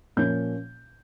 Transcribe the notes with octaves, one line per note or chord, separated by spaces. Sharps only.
A#2 F3 A#3 C#4 G6